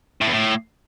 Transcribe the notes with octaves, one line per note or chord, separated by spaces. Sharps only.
A2
E2
A2